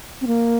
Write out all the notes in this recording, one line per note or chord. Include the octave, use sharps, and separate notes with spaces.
C4
A#3